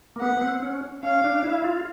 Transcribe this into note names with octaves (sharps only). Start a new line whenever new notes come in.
A#3
B3 F#5
B3
C4
C#4
C#4 F5
D4
E4
F4